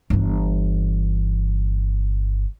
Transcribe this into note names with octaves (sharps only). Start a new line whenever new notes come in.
G1 E3